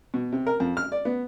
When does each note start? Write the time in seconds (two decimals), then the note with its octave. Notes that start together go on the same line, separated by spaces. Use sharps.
0.14 B2
0.32 C3
0.47 A#4
0.60 F2
0.77 F6
0.92 D5
1.05 B3